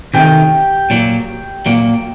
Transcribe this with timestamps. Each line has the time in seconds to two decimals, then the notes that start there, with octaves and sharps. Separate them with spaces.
0.14 C3 D#3 F#3 A3 C#4 G4
0.90 A#2 F#3 A#3
1.66 A#2 F#3 A#3